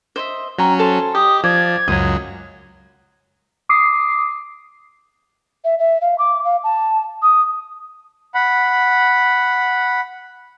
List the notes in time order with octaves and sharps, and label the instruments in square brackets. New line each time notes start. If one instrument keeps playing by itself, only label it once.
[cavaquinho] C5 D#5 E5
[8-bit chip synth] F#3 C#4 [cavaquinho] G5 A#5
[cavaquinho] A4 C5 A5
[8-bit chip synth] G4 [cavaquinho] D#5 [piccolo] D#6
[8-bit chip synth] F3 [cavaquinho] D5 [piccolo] G#6
[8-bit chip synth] C#2 F#2 F#3 [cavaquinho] D#6
[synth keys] D6 D#6 C7
[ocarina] E5
E5
F5
D6
F5
A5
D#6
[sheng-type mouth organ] F#5 B5